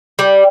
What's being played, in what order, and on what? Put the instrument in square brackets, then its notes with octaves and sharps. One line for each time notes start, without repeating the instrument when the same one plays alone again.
[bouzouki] G3